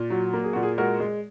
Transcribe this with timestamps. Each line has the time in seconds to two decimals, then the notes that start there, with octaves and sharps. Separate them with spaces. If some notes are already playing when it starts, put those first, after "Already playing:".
Already playing: A#2
0.10 F#3 F#4
0.33 A#3
0.44 G#4
0.53 A#2 F#4
0.63 G#4
0.78 G#3 F#4 A#4
1.00 G#3